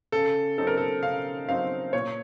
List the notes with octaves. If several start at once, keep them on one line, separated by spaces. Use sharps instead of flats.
C#3 A4
F#3 C4 D#4 A4
A#4
A4
C#3 F5
F#3 C4 D#4 F5
A#2 C#5